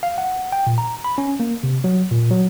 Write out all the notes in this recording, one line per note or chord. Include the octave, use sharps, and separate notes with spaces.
F5
F#5
G5
A#2
A#5
B5
C#4
A#3
C3
F#3
A#2
F#3